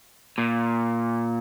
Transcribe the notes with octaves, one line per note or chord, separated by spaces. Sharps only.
A#2